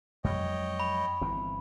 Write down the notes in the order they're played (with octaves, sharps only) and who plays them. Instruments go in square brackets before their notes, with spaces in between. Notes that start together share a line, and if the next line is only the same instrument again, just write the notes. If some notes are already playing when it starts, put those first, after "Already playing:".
[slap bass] F2 F#3 G#3 [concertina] C#5 D#5 G5
[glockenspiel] B5
[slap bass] G1 E3 C4